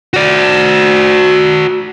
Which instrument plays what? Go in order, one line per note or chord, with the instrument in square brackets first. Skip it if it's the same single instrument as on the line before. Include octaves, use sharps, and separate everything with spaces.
[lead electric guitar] F#4 D5